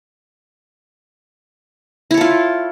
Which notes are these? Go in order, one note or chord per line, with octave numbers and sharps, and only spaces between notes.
E4 F4 A4 C#5